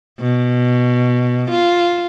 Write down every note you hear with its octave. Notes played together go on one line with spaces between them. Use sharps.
B2
F4